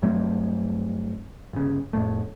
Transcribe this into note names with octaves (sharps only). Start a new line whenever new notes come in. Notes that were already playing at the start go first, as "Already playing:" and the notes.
G2 F#3 A3 C4
G1 C#3
F2 A2 A3